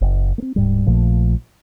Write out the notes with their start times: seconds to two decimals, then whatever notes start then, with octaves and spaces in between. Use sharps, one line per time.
0.01 F#1
0.38 A#3 C4
0.56 D1 G#2 G3
0.86 A#1 A#2 F3 A3